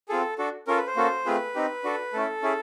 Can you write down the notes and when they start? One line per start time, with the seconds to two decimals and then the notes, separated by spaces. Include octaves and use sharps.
0.09 C4 F4 G#4 A4
0.38 D4 F#4 A4
0.67 C#4 F4 A4 A#4
0.77 B4
0.87 C5
0.96 A#3 C#4 F#4 A4
1.26 A3 C4 F4 G#4 B4
1.55 C4 D#4 G4
1.84 D4 F#4 A4
2.13 A3 C#4 E4 A4
2.42 C#4 E4 G#4